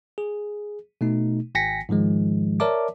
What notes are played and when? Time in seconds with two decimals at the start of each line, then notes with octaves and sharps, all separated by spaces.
0.18 G#4
1.01 B2 A3 D#4
1.55 G#1 G5 G#5 A#6 B6 C#7
1.89 G#2 D#3 F3 G#3
2.60 A#4 C#5 D5 E5 A5 D6